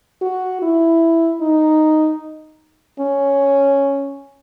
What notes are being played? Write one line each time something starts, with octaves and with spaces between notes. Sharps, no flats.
F#4
E4
D#4
C#4